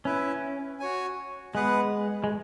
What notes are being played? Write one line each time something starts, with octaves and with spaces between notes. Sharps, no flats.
C#4 E4 B4 E5
F#4 C#5 G#5
G#3 B3 G#4 B4 F#5
G#3